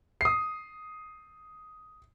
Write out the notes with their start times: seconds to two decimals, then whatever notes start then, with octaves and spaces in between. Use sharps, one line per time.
0.21 D#6 C7